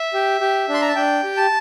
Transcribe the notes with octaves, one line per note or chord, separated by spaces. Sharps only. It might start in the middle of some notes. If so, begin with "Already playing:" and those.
Already playing: E5
G4
G4
D4
C6
A#5
A5
D4 G5
G4
A5